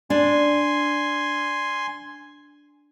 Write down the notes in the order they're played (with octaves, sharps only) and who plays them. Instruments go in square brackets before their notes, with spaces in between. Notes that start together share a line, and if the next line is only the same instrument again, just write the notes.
[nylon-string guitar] D4 [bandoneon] G#5 C6